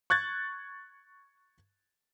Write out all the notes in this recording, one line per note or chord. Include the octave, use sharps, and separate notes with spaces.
C#6 F#6 G#6 A6